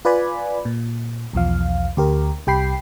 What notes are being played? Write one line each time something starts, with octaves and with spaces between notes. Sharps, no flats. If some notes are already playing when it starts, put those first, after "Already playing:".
F4 B4 D5 G#5 B5
A#2
B1 E2 F3 F5
D2 G4 A#4
C2 G4 G5 B5 C7